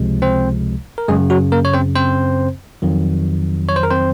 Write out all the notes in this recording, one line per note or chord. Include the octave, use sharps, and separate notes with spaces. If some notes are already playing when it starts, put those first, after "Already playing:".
Already playing: C#2 C3 F3 G#3
C4 C5
A#4
F#2 C#3 F#3 G#3 G#4
F#3 F#4
A#3 A#4
C#5
C4 C5
C4 C5
F2 D#3 F#3
C#5
C5
A#4
C4 C5